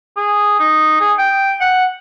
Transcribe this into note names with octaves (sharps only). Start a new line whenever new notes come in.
G#4
D#4
G#4
G5
F#5